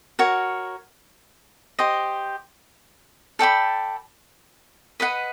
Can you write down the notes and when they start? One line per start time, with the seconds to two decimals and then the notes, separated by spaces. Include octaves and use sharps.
0.19 F#4 A#4 C#5
1.79 G4 C5 D#5
3.39 A4 D5 G5 B5
5.00 B4 D#5 F#5 B5